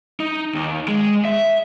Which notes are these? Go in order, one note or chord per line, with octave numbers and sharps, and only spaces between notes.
D#4
D#2
G#3
E5